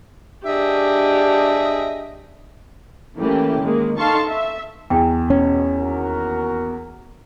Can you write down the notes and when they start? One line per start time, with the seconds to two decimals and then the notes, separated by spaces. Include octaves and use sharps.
0.46 D4 G4 G#4 D#5 E5
3.17 E3 A3 A#3 C#4 E4 G4
3.61 D#3 G#3 A#3
3.97 D#4 A4 F5 A5 C6 C#6
4.28 E5
4.90 E2 G5
5.30 B2 C#4
5.79 D#2 F#4 A#4